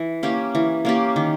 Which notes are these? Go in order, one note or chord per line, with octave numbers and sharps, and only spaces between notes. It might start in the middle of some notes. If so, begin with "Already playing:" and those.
Already playing: E3
A#3 C#4 G4
E3
A#3 C#4 G4
D#3